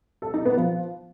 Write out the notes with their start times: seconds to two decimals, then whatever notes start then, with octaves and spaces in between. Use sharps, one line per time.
0.22 A4
0.34 D#4
0.45 B3
0.57 F3